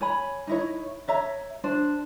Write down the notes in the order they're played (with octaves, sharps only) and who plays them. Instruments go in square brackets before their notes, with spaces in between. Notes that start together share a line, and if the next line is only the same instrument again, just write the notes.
[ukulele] C#5 G#5 B5
D#4 E4 C#5
C#5 E5 A#5
D4 C5